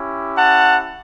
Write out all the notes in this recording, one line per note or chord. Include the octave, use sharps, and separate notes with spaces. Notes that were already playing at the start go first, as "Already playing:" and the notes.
Already playing: C#4 E4 G4
F#5 A5